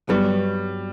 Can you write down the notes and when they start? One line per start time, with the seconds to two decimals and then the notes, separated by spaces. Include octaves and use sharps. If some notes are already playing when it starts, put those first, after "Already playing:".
0.09 G2 F#3 G3 B3 F#4